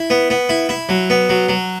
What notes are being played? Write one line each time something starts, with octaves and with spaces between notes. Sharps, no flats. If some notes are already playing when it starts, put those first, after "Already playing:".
Already playing: E4
B3
B3
E4
E4
F#3
B3
F#3
F#3